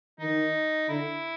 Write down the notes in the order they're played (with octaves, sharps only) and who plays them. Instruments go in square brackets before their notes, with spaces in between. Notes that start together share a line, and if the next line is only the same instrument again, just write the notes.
[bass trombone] D#3 [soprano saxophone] D#4
[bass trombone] D3 [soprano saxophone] E4